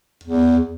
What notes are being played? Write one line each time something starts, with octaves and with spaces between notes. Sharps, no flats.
E2